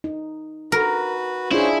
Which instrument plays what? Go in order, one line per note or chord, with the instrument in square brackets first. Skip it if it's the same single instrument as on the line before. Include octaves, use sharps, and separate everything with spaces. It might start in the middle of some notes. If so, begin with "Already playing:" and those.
[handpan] D#4
[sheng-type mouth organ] F#4 B4 [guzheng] A#4
[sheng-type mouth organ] C#4 C5 [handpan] D4 F4 G#4 [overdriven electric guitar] E4